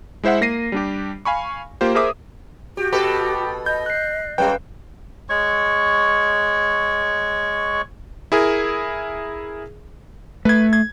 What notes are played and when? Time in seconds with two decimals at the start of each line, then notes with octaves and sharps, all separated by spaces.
0.23 G#3 E4 C5 E5 F#5
0.41 A#3 A#6 C7 D#7
0.72 G3 D4 G4
1.25 F5 G#5 B5 C#6
1.81 A#3 F4 G4 C5
1.95 G#4 A#4 C5 E5 D6 D#6
2.77 F#4 G4
2.93 B2 G4 A4 B4
3.66 D#5 G6
3.86 F#6 C7
4.38 F#2 G3 B4 F5 G5
5.29 G#3 C#5 C#6
8.32 E4 G#4 A#4
10.45 A3 B4 G#6
10.73 G#6